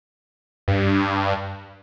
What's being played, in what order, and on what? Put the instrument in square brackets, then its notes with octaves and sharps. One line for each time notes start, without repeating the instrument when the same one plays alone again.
[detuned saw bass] G2